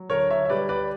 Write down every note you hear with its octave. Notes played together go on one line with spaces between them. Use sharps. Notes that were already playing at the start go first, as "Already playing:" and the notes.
Already playing: F#3
D3 A#4 C#5
C#5 E5
E5
G3 B4 D5
B4 D5